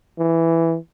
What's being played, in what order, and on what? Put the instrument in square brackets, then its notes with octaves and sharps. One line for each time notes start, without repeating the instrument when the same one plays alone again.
[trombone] E3